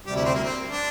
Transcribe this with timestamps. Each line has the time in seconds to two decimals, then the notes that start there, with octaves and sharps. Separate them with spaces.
0.06 D2 C3 G3 G4
0.16 E4
0.25 C4
0.34 A#3
0.44 C4
0.69 D4